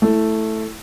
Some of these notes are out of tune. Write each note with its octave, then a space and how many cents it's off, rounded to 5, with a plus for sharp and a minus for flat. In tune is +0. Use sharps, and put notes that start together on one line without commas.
A3 +0 E4 +0